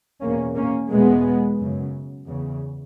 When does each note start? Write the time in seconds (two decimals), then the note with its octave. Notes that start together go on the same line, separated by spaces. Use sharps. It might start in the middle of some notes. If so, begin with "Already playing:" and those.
0.22 E2 B2 A#3 C#4
0.56 A#3 C#4
0.90 E2 B2 G#3 B3
1.58 F#2 C#3
2.26 E2 C#3